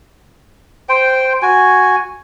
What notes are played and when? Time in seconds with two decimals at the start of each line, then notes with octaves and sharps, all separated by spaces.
0.89 C5 G5
1.42 F#4 G#5